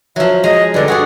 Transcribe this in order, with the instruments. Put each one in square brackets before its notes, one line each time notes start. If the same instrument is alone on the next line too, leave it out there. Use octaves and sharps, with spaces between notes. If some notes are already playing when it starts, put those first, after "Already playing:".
[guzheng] F3 F#3 [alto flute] E5
[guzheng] G#3 G#5 A#5 [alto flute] D#5
[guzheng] G2 D3 A#5 [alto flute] D5
[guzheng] F#4 G#4 D5 [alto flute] F#5